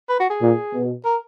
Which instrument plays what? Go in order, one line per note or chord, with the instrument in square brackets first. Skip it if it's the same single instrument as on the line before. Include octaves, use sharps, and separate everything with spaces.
[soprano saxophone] B4
F#4
G#4
[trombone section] A#2
B2
[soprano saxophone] A#4